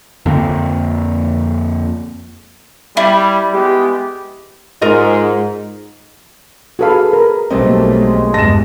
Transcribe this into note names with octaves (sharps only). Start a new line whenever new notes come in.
F2 D3 A#3 C4
G3 E4
G#3 B3 G4
G#2 F4 A#4 D#5
F#4 G#4 A4 B4 F5 B5
A#4
B1 G3 A3 A#3 C4 D#5
G#3
E2 G2 A5 A#6 E7